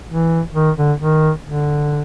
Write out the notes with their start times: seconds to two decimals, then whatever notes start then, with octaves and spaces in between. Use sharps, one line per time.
0.09 E3
0.54 D#3
0.77 D3
0.99 D#3
1.44 D3